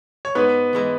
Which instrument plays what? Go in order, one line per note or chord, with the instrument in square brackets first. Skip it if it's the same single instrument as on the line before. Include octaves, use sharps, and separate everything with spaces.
[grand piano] C#5
[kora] G#2 [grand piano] B3 B4
[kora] E3 G#3 E4